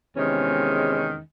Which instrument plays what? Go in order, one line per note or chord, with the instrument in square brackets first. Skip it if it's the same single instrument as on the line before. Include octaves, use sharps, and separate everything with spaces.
[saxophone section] E2 C3 D#3 G#3 C#4